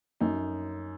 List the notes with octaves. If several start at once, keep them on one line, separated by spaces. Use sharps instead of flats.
F#2 D#4